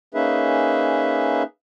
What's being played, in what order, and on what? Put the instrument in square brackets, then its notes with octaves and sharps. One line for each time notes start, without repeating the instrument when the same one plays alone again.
[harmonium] A#3 C#4 D#4 G#4 B4 E5